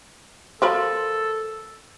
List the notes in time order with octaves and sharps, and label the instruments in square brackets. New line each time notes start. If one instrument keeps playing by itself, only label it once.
[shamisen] F3 A#4 B5 [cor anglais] A4